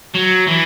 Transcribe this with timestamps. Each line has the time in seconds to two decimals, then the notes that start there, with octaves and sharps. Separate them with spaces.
0.15 F#3
0.48 E3